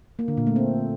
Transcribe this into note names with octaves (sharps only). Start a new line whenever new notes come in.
A#3
D3
A#2
A3
C4